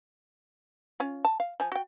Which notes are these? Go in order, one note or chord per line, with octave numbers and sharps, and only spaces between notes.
C#4 F4
A5
F5
F3 G#5
F#4 G5